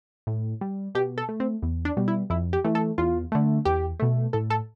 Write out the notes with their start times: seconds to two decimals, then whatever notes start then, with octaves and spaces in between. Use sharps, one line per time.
0.27 A2
0.61 G3
0.95 B2 G4
1.18 A4
1.29 A3
1.40 C4
1.62 E2
1.85 D4
1.97 B2 G3
2.08 E4
2.30 F2 E4
2.53 G4
2.64 E3 A3
2.75 A4
2.98 E2 F4
3.32 D3 A3
3.65 E2 G4
4.00 B2 A3
4.33 A2 A4
4.50 A4